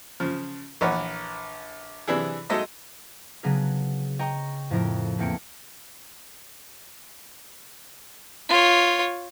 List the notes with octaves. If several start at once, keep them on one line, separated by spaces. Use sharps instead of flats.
C#3 F3
A#1 E3 A#4 B4 C#5 F#5
C3 E3 D4 E4 G#4
F#3 G#3 D#4 A4 D#5 E5
C#3 F#3 B3 D4 G#4 A#4
D#5 G5 A#5 C#6
F2 A2 F3 A#4
E2 A3 A#3 C4 C#7 D7
F4 C#5